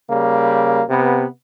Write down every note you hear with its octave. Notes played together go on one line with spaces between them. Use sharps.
C#3 G3 A#3
C3 B3